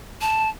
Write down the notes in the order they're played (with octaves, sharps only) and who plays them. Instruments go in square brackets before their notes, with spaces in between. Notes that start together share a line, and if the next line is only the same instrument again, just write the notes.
[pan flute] A5